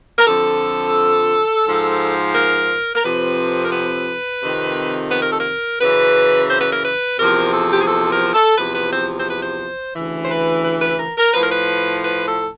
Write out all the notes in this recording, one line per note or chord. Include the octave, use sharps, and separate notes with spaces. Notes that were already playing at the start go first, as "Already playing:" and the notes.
A#4
F2 D3 F3 A4
G#2 F3
A#4
A#4
F2 C3 F3 B4
A#4
B4
F2 C3 D#3
B4
A#4
A4
A#4
F#2 C#3 E3 B4
C5
B4
A#4
B4
E2 C3 F3 A#4
A4
G4
G#4
A4
A#4
A4
E2 C3 F3 B4
B4
C5
C5
B4
C5
D2 C#3 E3
C5
B4
B4
B4
A#4
A#4
A2 F3 B4
A#4
B4
B4
A4